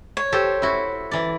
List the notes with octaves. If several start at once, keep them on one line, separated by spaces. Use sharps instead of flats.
C#5
G4 A4 C5
E4 F#4
E3 D5